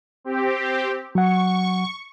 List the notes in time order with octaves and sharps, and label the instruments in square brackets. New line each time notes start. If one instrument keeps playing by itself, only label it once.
[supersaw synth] C4 G4
[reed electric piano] F#3 F#5 [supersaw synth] C#6